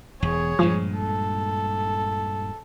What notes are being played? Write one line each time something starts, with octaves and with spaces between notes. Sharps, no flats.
E1 E2 G#4 C#5
G2 A#2 F3 G#3
A4